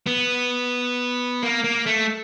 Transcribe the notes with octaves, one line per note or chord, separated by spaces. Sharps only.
B3
A#3
A#3
A3